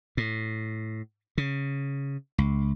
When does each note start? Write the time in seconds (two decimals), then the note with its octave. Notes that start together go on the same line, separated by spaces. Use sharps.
0.17 A2
1.38 C#3
2.38 C#2